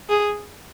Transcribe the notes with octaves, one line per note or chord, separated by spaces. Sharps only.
G#4